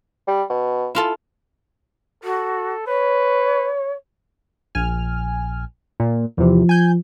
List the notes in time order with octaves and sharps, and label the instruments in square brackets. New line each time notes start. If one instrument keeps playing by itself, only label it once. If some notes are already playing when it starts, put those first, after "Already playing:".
[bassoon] G3
B2
[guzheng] E4 F4 A4
[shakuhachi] F#4 [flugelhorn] A4
[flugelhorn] B4 [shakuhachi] C#5
[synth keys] A#1 G#5 F6
A#2
[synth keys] E2 C3 [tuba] F3
[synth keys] G#5 G6